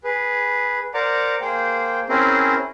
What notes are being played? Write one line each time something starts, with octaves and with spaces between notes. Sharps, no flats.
G#4 B4
A#4 C5 D5 F#5 A#5 D6
A#3 G#4 C5 G5
C4 C#4 E4 G#4 A#4 C5